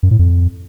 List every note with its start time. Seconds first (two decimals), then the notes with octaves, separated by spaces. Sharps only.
0.03 F#2
0.11 A2
0.19 F2